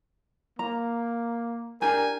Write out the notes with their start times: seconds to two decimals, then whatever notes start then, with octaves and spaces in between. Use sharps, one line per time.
0.59 A#3 A#5
1.82 D4 G4 A#4 G#5